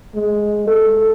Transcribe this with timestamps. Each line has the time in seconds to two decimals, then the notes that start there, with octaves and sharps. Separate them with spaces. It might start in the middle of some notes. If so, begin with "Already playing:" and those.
0.14 G#3
0.67 A4